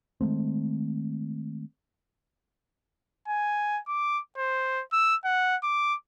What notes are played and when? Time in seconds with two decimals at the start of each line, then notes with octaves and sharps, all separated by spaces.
0.21 D#3 G#3 A3 C4
3.28 G#5
3.88 D6
4.38 C5
4.93 E6
5.25 F#5
5.63 D6